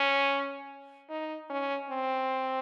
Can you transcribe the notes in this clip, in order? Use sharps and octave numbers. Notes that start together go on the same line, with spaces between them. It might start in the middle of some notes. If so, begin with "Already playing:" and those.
Already playing: C#4
D#4
C#4
C4